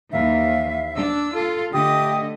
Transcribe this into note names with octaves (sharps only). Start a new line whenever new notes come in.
D#2 E3 E5 F5
D4 E6
F4 A4
D3 A3 G4 D#5 D#6